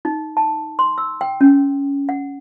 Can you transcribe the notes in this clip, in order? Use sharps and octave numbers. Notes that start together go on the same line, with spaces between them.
D#4
A5
C6
E6
G5
C#4
F#5